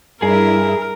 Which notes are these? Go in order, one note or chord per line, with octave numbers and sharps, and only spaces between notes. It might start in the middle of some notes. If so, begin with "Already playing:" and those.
G2 G3 D4 E4 G#4 A#4